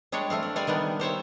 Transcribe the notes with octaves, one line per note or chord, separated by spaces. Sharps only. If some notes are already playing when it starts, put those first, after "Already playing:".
G3 G#3 D4 G4 C#5
A3 C4 F5
D4
G3 G#3 D5 F5 G#5
D#3 G3 B3 D4
G4 C5 C#5 E5